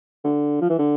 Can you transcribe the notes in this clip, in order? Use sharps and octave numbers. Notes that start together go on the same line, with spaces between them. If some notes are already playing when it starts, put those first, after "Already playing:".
D3
F3
E3
D3